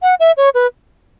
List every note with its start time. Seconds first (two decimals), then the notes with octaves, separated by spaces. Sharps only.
0.02 F#5
0.20 E5
0.37 C#5
0.54 B4